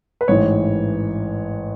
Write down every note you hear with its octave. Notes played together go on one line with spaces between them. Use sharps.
B4
A1 G#2 E3 C#5